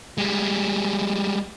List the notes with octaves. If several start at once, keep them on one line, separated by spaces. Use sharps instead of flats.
G3 G#3